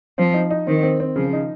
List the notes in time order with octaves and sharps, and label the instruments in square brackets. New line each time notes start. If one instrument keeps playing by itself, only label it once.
[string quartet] F3 [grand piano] C4
[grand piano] D#4
D#4
[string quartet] D#3 [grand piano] C4
[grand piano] C4
C4
[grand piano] C#3 [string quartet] F3
[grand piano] D#4